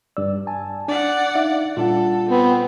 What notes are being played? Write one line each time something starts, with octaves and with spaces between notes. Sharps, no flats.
G2 D5 E6
G#5 A5
D4 D5 F#5
D#4 E5 F5
A#2 G3 D4 F4 A4 F#5
B3 C4